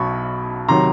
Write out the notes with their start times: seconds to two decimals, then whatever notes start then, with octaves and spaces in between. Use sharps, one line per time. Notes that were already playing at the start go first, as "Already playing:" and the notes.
Already playing: B1 B2 F#3 B5 C#6
0.69 C3 D#3 F#3 A#5 C6